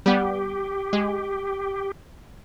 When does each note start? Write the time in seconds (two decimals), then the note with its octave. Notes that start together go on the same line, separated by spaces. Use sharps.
0.06 G3 B3 G4
0.93 G#3